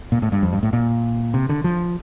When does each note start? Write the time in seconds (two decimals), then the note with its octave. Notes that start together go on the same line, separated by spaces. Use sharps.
0.12 A#2
0.22 A2
0.32 G2
0.42 F2
0.53 G2
0.63 A2
0.73 A#2
1.34 C3
1.49 D3
1.64 F3